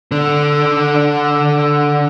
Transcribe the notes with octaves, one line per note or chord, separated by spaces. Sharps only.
D3 D4